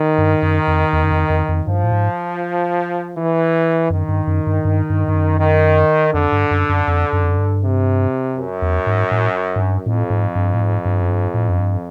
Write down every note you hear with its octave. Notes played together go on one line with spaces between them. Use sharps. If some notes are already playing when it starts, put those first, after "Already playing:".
Already playing: D#3
G2
F#2
F2
E2
F#2
F2
F2
F2
G2 F3
A2
G#2
E3
F#2 D#3
G2
F#2
G2
G2
G2
G2
F#2
D#3
F2 D3
G2
F#2
F#2
F2
F#2
F2
F#2
G2
C3
F#2
E2
G#2
A2
G#2
G2
F2 A2
G#2
G2
A2
G#2
G2
F#2
G2
A2
F#2
G2